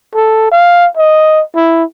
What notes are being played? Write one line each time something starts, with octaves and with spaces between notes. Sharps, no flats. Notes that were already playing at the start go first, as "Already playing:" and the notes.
A4
F5
D#5
E4